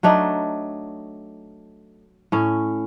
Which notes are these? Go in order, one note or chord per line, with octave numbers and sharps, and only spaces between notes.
F#3 A3 D4 D#4
A2 C#4